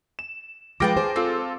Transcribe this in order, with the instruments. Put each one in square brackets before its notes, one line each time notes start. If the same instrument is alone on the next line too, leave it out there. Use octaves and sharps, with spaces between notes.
[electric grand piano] E7
[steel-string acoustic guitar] F3 G#3 B4 [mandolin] F4 G5 A5 [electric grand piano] D6 A#6
[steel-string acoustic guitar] G#4 C5
[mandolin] C4 [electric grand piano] F4 A4